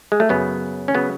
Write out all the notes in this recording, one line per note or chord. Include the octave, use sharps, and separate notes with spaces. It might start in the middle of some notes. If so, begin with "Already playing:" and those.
G#3
A3
F#2 C#3 F#3 B3
C#4
C#3 F#3 B3